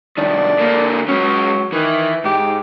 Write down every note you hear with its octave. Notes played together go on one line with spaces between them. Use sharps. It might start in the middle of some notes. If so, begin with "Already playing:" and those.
C2 D#3 D4
D3 A#3
F#3 G#3 C#4
D#3 E3
G#2 G4